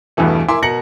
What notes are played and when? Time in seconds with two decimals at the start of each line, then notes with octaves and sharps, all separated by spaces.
0.17 E2 G2 B2 E3 A3
0.48 E4 A#4 E5 G#5 C6 D6
0.62 B2 A#4 A#6 C#7 F#7